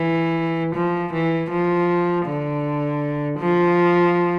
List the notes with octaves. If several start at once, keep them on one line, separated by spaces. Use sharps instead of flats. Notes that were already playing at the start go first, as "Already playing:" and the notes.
Already playing: E3
F3
E3
F3
D3
F3